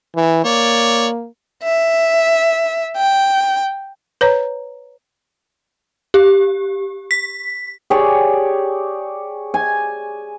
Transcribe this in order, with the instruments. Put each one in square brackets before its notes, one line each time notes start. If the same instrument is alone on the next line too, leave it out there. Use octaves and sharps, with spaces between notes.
[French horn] E3
[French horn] A#3 [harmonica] C#5 D5
[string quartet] E5
G5
[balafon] B4 C#5 A#5
[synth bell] G4
B6
[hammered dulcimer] G4 G#4 C#5 D5
G#5